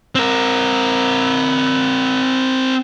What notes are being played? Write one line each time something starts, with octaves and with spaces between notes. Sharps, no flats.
C4 A#4